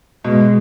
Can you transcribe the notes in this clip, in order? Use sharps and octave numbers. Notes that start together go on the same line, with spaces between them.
B2 G#3